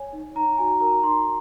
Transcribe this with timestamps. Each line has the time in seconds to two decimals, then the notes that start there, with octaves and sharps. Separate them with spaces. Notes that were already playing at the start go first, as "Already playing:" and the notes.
Already playing: C#5 G#5
0.13 D#4
0.35 D#4 A#5
0.58 F#4 G#5
0.80 A#4 A#5
1.03 D#4 C6